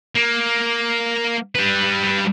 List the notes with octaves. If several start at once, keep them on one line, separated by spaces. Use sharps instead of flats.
A#3
G3 B4